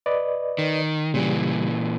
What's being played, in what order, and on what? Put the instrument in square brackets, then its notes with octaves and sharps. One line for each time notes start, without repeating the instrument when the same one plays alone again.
[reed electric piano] B4 D5 D#5
[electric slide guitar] D#3
[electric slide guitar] A#2 E3 [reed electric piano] C#3 G3